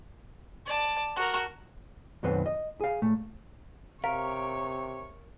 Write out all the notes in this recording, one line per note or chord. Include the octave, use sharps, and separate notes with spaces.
D5 A5
F#4 A#4
B1 F#2 D#3 F#3 C4 B4
D#5
G#4 F5
A#2 A3
C3 A#4 C#5 F5 C#6